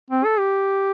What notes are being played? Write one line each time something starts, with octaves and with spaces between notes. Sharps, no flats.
C4
A4
G4